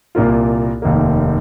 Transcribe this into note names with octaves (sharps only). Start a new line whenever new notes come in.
C2 A#2 A#3 F4
F1 D#2 D#3 A#3